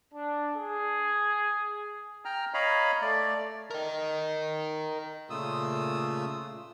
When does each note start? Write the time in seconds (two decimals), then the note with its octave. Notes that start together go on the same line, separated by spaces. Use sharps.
0.14 D4
0.56 G#4
2.25 G5 A#5 F6
2.54 C#5 D#5 F5 A#5 B5
3.02 A3 D5
3.71 A#4 D#5
5.30 A#2 C#3 A3 F4 D#6 E6